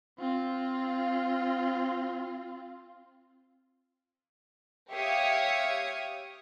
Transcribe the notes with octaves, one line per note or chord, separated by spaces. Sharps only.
C4 F4
G4 C#5 E5 F5 C#6 D#6